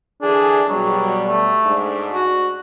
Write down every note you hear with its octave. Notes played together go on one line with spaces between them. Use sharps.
D3 E3 D4 G#4
B2 F#3 G3
A3
G#2 D4
F#4